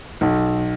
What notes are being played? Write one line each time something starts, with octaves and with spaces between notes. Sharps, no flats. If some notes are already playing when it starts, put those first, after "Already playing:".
B1